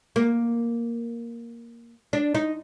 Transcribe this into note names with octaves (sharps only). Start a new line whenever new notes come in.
A#3
D4
D#4